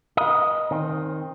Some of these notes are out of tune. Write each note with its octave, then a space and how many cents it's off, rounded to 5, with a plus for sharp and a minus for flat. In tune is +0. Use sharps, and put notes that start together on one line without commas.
A#4 +45 D#5 +0
D#3 +5 C4 +20